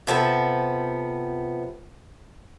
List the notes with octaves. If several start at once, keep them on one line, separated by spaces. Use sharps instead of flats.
C3 F3 B3 A4